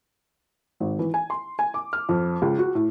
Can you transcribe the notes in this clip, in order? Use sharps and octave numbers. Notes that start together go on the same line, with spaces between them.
G#1
E3
G#5
C6
G#5
D6
F6
F2
C#2
F#4
A2